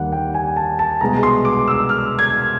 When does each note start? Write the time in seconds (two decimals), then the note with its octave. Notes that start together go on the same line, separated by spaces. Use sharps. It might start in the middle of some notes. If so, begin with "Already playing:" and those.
Already playing: D#2 D#3 G3 A#3 F#5
0.12 G5
0.34 G#5
0.56 A5
0.79 A5
1.01 C2 B2 G#3 A#5
1.23 C6
1.45 D6
1.68 E6
1.89 F6
2.19 G#6